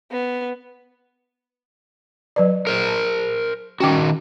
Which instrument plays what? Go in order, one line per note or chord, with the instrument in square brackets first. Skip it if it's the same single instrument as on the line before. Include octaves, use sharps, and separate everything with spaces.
[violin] B3
[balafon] F#3 B4 D5
[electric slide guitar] A#4 C5
[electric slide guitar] D#3 F#4 [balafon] C#4 G5 D6